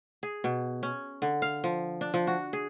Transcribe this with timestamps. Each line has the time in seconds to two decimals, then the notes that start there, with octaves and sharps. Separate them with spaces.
0.23 G#4
0.44 B2
0.83 C#4
1.22 D3
1.42 F5
1.64 F3
2.01 D4
2.14 F3
2.27 F#4
2.53 G#4